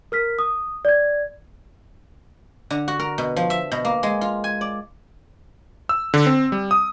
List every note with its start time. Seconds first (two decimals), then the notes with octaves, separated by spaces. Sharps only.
0.12 A#4 F6 B6
0.39 D#6
0.85 D5 G#6
2.70 D3
2.88 F#4
3.00 A#4
3.18 B2
3.36 F3
3.50 E5
3.72 B2
3.85 A#3
4.03 G#3
4.21 F4
4.44 G#5
4.61 D5
5.89 E6
6.14 D3
6.26 C4
6.52 G3
6.71 D#6